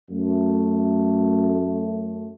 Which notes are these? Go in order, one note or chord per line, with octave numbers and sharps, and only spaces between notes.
F#2 A3